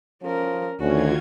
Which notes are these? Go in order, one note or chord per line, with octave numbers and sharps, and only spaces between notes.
F3 C#4 A#4
D2 D#3 C#4 F4 F#4 G#6